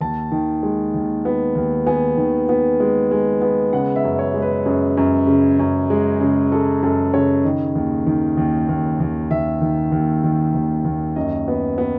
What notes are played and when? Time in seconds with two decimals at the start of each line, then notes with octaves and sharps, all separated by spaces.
0.01 D#2 A5
0.32 D#3
0.63 G#3
0.94 D#2
1.25 B3
1.55 D#2
1.87 B3 G#5
2.17 D#3
2.49 B3
2.80 G#3
3.11 G#3
3.42 B3
3.73 C#3 F#5
3.96 E5
4.04 F#2
4.19 C#5
4.34 G#3
4.42 B4
4.66 F#2 G#4
4.97 F#2
5.27 C#3
5.59 F#2
5.90 G#3
6.21 C#3
6.52 G#3 A4
6.82 F#2 A4
7.14 C#3 C#5
7.44 D#3 D#5
7.75 D#2
8.07 D#3
8.37 D#2
8.69 D#2
9.00 D#2
9.31 D#2 E5
9.61 D#3
9.92 D#2
10.24 D#3
10.54 D#2
10.85 D#2
11.16 F#2 D#5
11.48 B3
11.78 B3